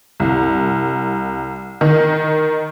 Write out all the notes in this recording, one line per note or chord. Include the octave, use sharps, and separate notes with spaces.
C2
D#3